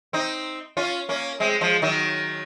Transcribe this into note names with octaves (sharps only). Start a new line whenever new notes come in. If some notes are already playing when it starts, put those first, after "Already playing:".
C4 D#4
C#4 F4
A#3 C#4
G#3 C4
F3 G#3
D#3 F#3